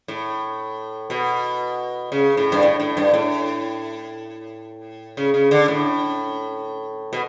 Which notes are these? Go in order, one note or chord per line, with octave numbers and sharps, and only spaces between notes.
A2
B2
C#3
A2
G2
A2
A2
G2
A2
C#3
C#3
D3
A2
B2